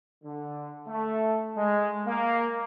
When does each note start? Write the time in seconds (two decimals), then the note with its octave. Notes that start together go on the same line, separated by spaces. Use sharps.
0.24 D3
0.88 A3
1.56 G#3
2.06 A#3